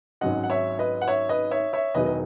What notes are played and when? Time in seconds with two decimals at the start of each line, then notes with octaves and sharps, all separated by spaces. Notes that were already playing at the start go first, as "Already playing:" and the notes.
0.21 G#1 G#2 F#3 C#4 D#5 F#5
0.44 F#5
0.50 C#5 E5
0.79 B4 D#5
1.02 F#5
1.08 C#5 E5
1.29 B4 D#5
1.51 C#5 E5
1.73 C#5 E5
1.94 E1 E2 D#3 F#3 B4 D#5
2.06 D#5